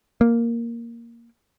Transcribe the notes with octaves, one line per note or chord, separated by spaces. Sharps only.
A#3